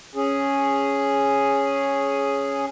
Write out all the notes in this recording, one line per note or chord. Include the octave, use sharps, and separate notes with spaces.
C#4 G#4